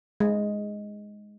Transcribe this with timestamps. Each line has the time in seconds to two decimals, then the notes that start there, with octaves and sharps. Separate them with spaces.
0.20 G#3